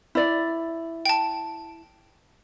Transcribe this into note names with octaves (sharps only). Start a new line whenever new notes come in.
E4 D5
G5 A5